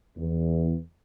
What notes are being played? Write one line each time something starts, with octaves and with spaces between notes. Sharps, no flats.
E2